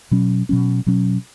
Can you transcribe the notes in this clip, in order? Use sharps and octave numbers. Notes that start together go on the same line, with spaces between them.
B2 F#3 C#4
B2 F#3 C#4
B2 F#3 C#4